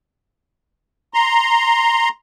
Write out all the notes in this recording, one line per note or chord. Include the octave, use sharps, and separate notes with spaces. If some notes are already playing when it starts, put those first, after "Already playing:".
A#5 C6